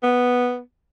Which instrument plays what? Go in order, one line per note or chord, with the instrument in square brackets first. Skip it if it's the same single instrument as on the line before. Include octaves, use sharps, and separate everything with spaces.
[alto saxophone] B3